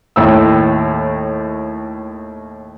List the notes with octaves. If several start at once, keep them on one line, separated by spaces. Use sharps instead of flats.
D#2 A2 G5 E6